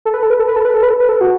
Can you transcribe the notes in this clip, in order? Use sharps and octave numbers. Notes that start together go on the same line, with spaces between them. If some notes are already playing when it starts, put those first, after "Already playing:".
A4
B4
A4
B4
A4
B4
A4
B4
A4
B4
A4
B4
A4
F#4